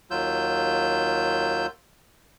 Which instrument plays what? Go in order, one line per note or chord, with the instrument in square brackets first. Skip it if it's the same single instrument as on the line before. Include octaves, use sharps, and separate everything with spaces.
[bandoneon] D#2 F#3 F4 E6 G6